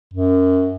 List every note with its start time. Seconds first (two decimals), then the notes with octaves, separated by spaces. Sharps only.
0.14 F#2